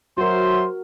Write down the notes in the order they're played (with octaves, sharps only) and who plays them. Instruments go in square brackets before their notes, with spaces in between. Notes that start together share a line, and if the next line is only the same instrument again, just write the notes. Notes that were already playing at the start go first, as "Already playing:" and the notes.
[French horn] F#3 [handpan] F#4 A#4 [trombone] C5 [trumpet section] E5 C6